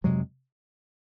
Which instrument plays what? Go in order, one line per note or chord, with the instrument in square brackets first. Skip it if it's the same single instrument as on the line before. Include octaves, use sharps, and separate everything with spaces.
[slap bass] F2 C3 F#3 G#3